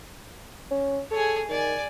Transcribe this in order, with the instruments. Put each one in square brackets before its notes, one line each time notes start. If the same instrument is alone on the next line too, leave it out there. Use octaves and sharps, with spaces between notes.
[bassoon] C#4
[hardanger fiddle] G#4 C#5 [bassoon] A4
[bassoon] D#3 [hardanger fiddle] D5 G#5